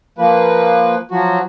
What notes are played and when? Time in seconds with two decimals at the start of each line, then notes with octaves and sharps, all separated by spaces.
0.18 F3 A#3 B4
1.11 F3 F#3 F#4